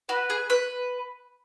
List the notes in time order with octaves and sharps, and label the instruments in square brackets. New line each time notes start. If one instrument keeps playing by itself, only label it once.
[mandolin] F#4 [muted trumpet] B4
[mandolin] G#4
B4